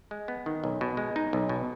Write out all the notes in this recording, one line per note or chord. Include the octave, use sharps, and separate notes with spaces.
G#3
B3
D#3
B1
B2
G#3
D#4
B1
B2